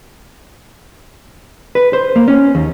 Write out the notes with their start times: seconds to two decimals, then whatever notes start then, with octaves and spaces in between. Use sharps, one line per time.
1.75 B4
1.93 C5
2.16 A#3
2.28 C#4
2.55 D#2